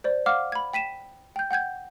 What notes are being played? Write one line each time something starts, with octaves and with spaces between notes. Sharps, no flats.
C5 D5
F5 F#5 D6 F6
B5 G#6
G5 B6 D#7 E7
G5 G6
F#5 G5 G6 G#6